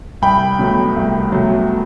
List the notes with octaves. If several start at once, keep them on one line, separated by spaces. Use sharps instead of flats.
C2 G5 B5
B2 F#3 A3
C2
B2 F#3 A3